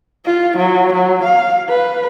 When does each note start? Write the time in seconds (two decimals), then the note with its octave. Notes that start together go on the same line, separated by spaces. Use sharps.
0.25 F4
0.57 F#3
0.93 F#3
1.24 F5
1.69 B4